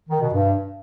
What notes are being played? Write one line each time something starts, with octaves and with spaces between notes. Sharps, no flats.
D#3
B2
G2